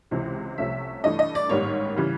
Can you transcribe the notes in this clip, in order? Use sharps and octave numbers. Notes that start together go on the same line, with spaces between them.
C#2 C3 E3 G#3 C4
C2 C3 F3 A3 C#4 E5
G2 E3 A3 D4 D#5
D#5
D5
A1 G#2 D#3 G3 A#3 C#5
C#3 E3 G3